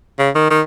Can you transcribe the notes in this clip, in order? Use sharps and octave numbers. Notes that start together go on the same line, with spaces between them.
C#3
D#3
D#3